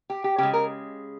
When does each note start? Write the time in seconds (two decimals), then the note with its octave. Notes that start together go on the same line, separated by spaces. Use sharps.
0.10 G4
0.24 G4
0.38 C#3 G#3 G4
0.54 A#4